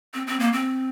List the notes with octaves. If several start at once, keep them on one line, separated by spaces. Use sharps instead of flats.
C4
C4
A#3
C4